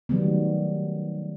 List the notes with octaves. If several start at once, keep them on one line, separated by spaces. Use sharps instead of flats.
D#3 F#3 G3 A3 B3